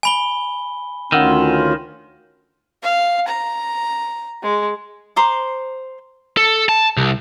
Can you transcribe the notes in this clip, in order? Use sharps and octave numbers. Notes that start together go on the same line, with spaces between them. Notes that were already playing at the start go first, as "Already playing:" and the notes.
G#5 B5 G7
D2 D#3 C#4 F4 F#5 E6
F5
A#5
G#3
C5 A#5 C6 D6
A4
A5
C2